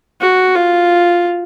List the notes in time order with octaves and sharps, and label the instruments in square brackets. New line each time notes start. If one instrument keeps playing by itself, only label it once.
[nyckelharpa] F#4
F4